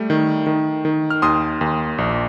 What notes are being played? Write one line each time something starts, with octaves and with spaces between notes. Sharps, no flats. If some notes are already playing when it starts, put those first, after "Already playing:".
Already playing: G3 A3
D#3
D#3
D#3
F6
D#2 C6 D#6
D#2
A#1